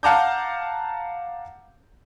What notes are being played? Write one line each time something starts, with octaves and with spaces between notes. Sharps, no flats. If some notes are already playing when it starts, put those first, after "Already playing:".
F5 F#5 A5 A#5 D6 G6